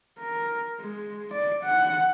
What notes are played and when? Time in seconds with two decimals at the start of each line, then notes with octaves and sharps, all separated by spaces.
0.20 A#4
0.80 G#3
1.34 D5
1.65 F#5